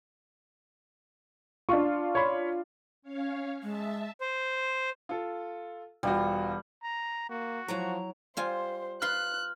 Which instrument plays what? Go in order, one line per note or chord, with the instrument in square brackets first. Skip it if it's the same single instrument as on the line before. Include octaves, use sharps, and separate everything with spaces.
[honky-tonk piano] D4 F4 [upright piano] C#6
[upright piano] C#5 B5 C6
[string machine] C#4 C#5 F5
[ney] G#3 [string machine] E5 A5
[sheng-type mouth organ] C5
[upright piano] F4 A4
[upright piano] E1 F4 F#4 [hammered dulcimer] G3
[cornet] A#5
[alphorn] A#3 [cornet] F#4
[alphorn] F3 [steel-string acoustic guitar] F#3 E4 A#5
[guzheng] G3 F4 G#5 [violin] C5
[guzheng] F4 B4 C6 [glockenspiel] F6 [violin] F#6